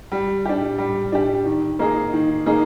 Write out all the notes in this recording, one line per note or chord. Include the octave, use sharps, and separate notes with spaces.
G3
D4 G4
G3
D4 G4
D#3
A#3 D#4 G#4
D#3
A#3 D#4 G#4